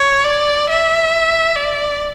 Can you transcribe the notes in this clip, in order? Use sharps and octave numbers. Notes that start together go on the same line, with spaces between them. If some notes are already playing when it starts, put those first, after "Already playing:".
Already playing: C#5
D5
E5
D5